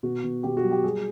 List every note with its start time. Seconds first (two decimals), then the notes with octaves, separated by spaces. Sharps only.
0.03 B2 F#4
0.24 B2
0.43 B2 G4
0.57 F#4
0.64 F#3
0.71 G4
0.84 G3 G#4